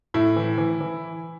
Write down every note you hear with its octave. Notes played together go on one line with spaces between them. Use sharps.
A2 E4
E3
E3
E3